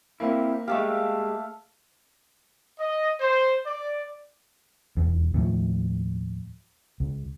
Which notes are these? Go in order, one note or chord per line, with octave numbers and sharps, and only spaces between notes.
A#3 C4 E4
G#3 A3 G4 A4 F5
D#5
C5
D5
D#1 E2
D#2 A2 F3
C#2